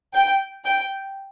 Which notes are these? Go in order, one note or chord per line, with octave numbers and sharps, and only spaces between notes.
G5
G5